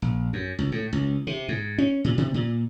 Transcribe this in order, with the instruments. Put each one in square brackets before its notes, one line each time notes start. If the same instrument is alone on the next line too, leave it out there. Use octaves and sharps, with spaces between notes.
[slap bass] A#1
F#2
C#2
A2
C#2
C3
G#2
C#4
A#2
C3
A#2